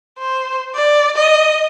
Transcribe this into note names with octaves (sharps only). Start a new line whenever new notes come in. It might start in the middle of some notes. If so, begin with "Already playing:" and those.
C5
D5
D#5